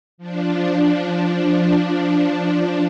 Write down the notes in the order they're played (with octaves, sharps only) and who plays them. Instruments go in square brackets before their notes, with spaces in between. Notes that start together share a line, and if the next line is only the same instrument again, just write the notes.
[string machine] F3 D4